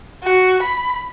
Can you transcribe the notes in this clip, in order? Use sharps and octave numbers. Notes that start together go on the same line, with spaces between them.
F#4
B5